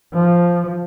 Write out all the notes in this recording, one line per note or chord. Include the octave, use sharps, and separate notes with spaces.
F3